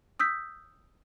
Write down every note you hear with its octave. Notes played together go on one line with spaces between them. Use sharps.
D#6 E6 G6 B6